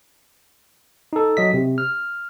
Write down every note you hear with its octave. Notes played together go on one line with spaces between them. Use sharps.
D#4 A4
F#3 D#5 B6
C3
F6